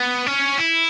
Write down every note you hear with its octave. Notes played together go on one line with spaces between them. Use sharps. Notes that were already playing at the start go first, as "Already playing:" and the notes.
Already playing: B3
C#4
E4